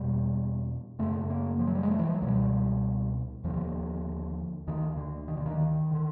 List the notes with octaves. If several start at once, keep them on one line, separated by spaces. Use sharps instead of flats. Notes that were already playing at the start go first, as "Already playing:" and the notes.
Already playing: E2 B2 G3
F#2 C#3 A3
A#3
F3
F#3
G3
G#3
A3
E3
F3
F#3
C#2 B2 G3
D#2 D3 F3
D2 D3 D#3
D3
D#3
D3
D#3
D3